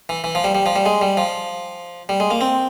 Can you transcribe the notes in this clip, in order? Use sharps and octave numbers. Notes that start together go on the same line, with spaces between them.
E3
E3
F3
G3
G3
F3
G3
G#3
G3
F3
G3
G#3
A#3
C4